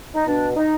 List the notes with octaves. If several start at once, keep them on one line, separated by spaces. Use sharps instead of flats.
D#4
B2 D4
D#4